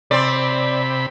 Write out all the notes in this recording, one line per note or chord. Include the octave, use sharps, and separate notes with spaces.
C3 C4 D5 B5